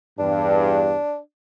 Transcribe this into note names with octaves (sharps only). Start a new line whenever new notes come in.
E2 G2 D4